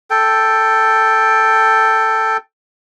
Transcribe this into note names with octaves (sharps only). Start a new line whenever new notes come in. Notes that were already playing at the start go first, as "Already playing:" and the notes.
A4 G5